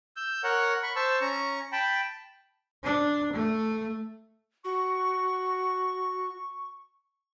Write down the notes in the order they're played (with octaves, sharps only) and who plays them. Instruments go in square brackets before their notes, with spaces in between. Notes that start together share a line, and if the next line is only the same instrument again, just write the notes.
[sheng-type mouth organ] E6 G6
A#4 C#5 F#5
B5 C#6
C5 A5 C#6 E6
C#4 A#5 C#6
G5 A5 B5
[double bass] D4
A3
[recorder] F#4 [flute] C#6